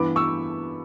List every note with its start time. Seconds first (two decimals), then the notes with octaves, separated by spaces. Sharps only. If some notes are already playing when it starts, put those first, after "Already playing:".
Already playing: G2 E3 B3 B5 D6
0.16 C#6 E6